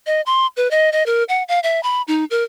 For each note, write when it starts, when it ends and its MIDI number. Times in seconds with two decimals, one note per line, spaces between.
0.06 0.21 75
0.26 0.47 84
0.57 0.70 71
0.71 0.90 75
0.93 1.05 75
1.06 1.24 70
1.29 1.43 78
1.48 1.60 77
1.63 1.82 76
1.83 2.02 83
2.08 2.25 63
2.31 2.44 70